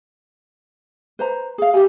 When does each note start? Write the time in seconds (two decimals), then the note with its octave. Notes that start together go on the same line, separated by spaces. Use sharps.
1.19 B4 C5 A#5
1.58 G#4 F5
1.74 G4 G#5